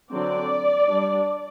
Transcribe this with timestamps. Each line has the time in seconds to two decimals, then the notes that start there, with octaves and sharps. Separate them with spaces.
0.12 D3 F#3 C4 D5
0.89 G3 D4